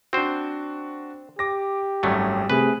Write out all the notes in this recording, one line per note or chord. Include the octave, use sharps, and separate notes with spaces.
C4 D4 F#4 C5
G4 D6 A#6
G#1 F#2 F#3 G3 A3
C3 A3 G#4 B4